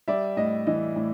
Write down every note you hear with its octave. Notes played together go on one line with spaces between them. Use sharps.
G3 D5 E5
A2 D#5
E3 D#5
A2